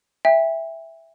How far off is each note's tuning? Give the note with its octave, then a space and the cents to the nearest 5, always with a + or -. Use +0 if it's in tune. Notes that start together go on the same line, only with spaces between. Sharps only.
E5 +0 G5 +40